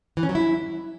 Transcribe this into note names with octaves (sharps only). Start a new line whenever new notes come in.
E3
C#4
F#3
E4